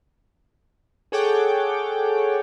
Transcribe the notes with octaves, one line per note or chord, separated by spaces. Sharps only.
G#4 A4 C#5 F#5 G5 D6